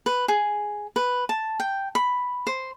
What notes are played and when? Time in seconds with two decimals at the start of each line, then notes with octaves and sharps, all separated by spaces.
0.06 B4
0.28 G#4
0.96 B4
1.29 A5
1.60 G5
1.95 B5
2.47 C5